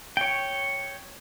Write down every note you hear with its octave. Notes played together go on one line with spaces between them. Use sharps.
C#5 G5